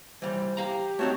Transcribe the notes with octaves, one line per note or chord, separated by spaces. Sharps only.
E3 G3 C5
G4 F5 A#5
A3 C4 D#4 F#4 C#5 A5